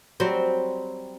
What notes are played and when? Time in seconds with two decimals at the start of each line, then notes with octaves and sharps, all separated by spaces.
0.20 F#3 G3 C4